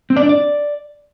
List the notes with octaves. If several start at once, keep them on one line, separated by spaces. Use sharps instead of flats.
C4
D5
D4
D5